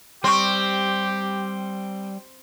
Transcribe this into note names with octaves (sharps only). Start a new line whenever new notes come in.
G3 C4 G4 C6 C#6